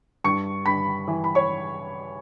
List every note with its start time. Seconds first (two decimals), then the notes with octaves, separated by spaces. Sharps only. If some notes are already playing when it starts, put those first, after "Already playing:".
0.24 G2 C#6 C#7
0.66 G2 B5 B6
1.08 E3
1.24 B5
1.35 C#5 C#6